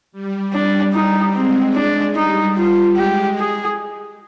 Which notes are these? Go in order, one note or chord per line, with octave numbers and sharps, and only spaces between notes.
G3
G3 D4
G3 D#4
G#3 C4
D4
G3 D#4
G3 F4
G#3 G4
G#4